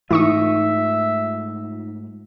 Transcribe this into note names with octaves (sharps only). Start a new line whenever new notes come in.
G#2 E3 A3 D#4 F4 E5 C#6 D#6